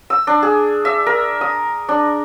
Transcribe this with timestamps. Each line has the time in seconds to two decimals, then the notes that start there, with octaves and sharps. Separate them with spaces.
0.10 E6
0.27 D4
0.43 G#4
0.85 E5
1.06 A#4
1.41 D#6
1.89 D4